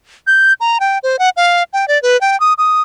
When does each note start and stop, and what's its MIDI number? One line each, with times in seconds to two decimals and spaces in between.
0.27 0.53 91
0.60 0.78 82
0.80 0.98 79
1.03 1.19 72
1.19 1.30 78
1.37 1.63 77
1.73 1.88 79
1.88 2.01 74
2.02 2.19 71
2.21 2.39 79
2.40 2.53 87
2.58 2.82 87